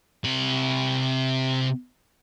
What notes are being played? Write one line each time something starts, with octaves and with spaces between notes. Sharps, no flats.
C3 B5